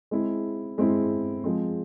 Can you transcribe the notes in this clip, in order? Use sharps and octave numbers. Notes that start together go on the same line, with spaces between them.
G#3 C4 E4
G#3 C4 E4
F3 G#3 C4